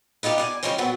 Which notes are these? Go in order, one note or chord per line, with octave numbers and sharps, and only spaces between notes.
B3 D#4 F4 G4 F5
D5 F5 G#5
C#3 F3 G#3 C4 C#4 C5
A#2 F#3 B3 C4 F#4 A4